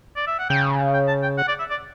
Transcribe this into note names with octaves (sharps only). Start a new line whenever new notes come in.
D5
E5
F#5
C#3 G5
G5
A5
G5
F#5
D5
E5
D5